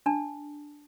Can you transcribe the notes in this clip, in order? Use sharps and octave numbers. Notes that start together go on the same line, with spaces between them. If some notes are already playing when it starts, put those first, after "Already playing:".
D4 A5